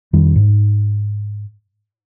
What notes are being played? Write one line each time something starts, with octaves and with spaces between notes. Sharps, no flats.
F2 D#3 G3
G#2